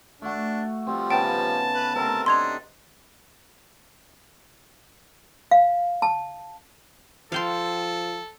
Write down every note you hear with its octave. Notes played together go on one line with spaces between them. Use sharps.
A3 D4 F#4
F3 G3 C4
C#3 B3 D#4 G5 A5
B4
C3 C4 A4 A#4 D#5
D4 D#4 C6 G#6 F7
F5
A5
F3 A4 F5 G5 C6